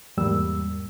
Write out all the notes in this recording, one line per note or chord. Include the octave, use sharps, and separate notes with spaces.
E2 G#2 G3 A#3 E6